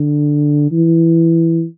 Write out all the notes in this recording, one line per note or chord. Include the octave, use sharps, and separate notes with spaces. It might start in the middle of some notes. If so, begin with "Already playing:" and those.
Already playing: D3
E3